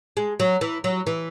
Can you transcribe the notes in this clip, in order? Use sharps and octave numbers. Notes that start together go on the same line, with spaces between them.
G#3
F#3
E3
F#3
E3